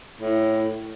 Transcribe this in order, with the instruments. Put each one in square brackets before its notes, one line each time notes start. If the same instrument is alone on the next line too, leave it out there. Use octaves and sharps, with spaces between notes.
[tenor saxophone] A2